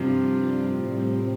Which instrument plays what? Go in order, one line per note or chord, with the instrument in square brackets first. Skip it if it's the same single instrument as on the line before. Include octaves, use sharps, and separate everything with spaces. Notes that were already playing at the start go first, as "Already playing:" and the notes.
Already playing: [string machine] G2 G3 D4 F4 [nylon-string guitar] C3 F3
[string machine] A2 G3 C4